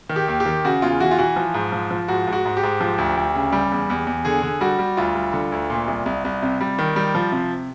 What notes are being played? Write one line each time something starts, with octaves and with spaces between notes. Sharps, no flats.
D#3
G4
D#2
G4
D#3
C#3 F#4
E2 F4
E3 F#4
F4
E3 F#4
F3
G#2
F3
F3
G#2 F#4
G#2
F#4
G#2
G4
G#2
F3
D2
D2
C#3
G3
E2
E2
E2
D3 G#4
D3
G3 F#4
G3
D2 F4
G3
D3
D2
A#2
C2
C2
C2
C3
G3
D#3
G3
F3
C3